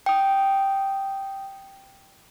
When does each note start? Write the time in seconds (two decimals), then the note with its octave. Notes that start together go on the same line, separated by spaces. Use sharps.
0.06 G5 D#6